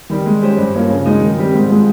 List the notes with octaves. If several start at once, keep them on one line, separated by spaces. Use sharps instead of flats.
D#3 G3
G#3
C#4 G4 C5
G2
F3 A#3 C#4
C#3
G#3 D#4
D#3
G3 C4 G4
G#2
F3 G#3